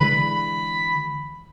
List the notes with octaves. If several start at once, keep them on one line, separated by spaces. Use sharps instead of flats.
D3 E3 G#3 B5